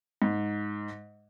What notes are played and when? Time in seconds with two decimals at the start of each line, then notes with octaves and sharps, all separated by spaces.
0.22 G#2